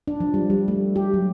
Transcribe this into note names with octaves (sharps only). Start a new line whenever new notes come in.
D4
F3
G3
G3
A3
G4
F#3